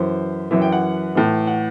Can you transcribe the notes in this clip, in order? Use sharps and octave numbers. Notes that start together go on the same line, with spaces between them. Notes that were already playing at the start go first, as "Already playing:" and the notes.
Already playing: F#2 E3 C5
F#2 E3 E5
G5
F#5
A2 E3
F#5